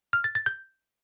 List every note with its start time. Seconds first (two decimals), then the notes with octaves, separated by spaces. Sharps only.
0.13 F6
0.24 A6
0.35 A6
0.46 G6